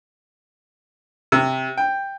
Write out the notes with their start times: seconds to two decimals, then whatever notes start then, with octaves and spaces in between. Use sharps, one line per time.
1.32 C3
1.78 G5